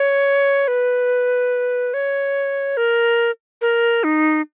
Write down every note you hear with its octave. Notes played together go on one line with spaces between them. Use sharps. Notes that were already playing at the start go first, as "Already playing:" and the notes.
Already playing: C#5
B4
C#5
A#4
A#4
D#4